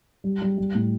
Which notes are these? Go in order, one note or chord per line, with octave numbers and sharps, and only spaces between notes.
G3
G3
G3
A2